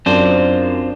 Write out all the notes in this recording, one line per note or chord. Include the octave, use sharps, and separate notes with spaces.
F#2 C4 D4 F4 C5